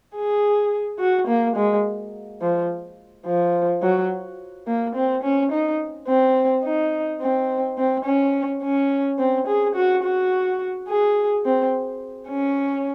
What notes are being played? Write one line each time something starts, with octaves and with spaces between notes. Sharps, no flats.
G#4
F#4
A#3
G#3
F3
F3
F#3
A#3
C4
C#4
D#4
C4
D#4
C4
C4
C#4
C#4
C4
G#4
F#4
F#4
G#4
C4
C#4